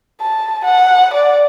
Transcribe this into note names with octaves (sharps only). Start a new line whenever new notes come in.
A5
F#5
D5